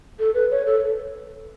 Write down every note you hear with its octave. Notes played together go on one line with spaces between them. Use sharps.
A4
B4
C#5
A4